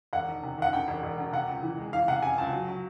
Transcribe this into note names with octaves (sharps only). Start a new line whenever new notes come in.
E1 F#5
D#3
C3
D#3 F#5
D2 G5
E1
E1
D2
C3 F#5
C#2
E3
G#3
E3 F5
C3 F#5
C3 G#5
C#2 A5
F#3
F#3